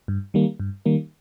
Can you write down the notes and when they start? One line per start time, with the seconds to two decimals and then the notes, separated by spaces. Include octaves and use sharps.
0.08 G2
0.34 D#3 G3 A#3
0.60 G2
0.86 D#3 G3 A#3